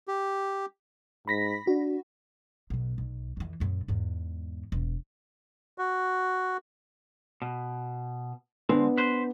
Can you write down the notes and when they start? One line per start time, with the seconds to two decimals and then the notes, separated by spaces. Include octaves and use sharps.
0.08 G4
1.28 G#2 B5 A#6 B6
1.67 D4 F#4
2.70 B1 B2
2.98 B1
3.37 F2 E3
3.60 F#2 A#2
3.88 E2 G#2
4.72 E1
5.78 F#4
7.42 B2
8.69 D3 G#3 B3 C4 D4
8.98 B4 C5